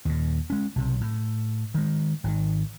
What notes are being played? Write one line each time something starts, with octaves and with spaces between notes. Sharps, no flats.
D#2 A#2
G#3 C#4
B1 C3
A2
D#3 G#3
G#1 B2 D#3